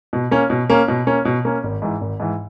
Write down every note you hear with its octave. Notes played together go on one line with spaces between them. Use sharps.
B2
A#3 C#4
B2
A#3 C#4
B2
A#3 C#4
B2
A#3 C#4
G#1
G#2 E3
G#1
G#2 E3